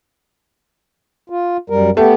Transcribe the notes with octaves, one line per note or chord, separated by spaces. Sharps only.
F4
F#2 G3 A#4
A3 B3 G4